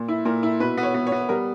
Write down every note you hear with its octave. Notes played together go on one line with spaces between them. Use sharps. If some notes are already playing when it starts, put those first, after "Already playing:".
Already playing: A#2
E4
A#2 A#4
E4
B2 B4
B3
C#5
B3
C#5
B3
G3 A#4